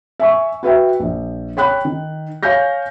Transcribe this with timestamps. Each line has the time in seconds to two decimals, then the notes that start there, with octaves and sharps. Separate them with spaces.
0.20 E5 G#5 C#6
0.63 F#4 B4 E5 G5
1.00 A#1
1.57 C#5 G5 B5 F#6
1.85 D#3
2.43 C#5 F5 G#5 F6 G6 A#6